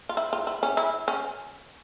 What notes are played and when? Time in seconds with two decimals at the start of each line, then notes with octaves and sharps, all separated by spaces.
0.09 F4
0.17 E4
0.33 F4
0.47 E4
0.63 C#4
0.77 E4
1.08 C#4